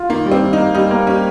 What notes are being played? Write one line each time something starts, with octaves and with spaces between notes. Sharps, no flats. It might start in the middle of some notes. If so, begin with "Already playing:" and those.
Already playing: F4
D#3 A#3
G3
C4
D#3
A#3 D#4
G3 D#4
A#3
G3 C#4